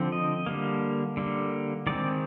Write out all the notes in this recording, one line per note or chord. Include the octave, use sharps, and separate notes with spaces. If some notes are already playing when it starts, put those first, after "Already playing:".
Already playing: D3 F3 C4
D#5
D3 G3 A#3
D3 G3 A#3
D#3 G#3 C4 D5